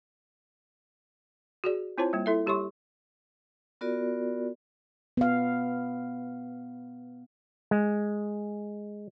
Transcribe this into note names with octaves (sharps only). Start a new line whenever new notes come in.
F#4 G#4 D5
C4 E4 F4 C5 C#5 A5
G3 A#3
E4 A4 E5
G3 G4 C#5 C6 C#6
B3 F4 F#4 A#4 D5
B3 F5
G#3